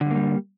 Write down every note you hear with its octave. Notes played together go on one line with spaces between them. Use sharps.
G2 D3 G3 A#3